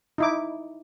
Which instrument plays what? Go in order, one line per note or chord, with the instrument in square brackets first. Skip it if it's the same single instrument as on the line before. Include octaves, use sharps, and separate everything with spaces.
[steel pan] D#4 E4 D6